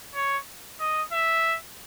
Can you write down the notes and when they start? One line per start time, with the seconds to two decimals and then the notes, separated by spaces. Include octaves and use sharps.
0.15 C#5
0.80 D#5
1.12 E5